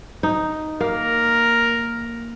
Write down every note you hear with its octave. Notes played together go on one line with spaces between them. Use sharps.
D#4
A#3 A#4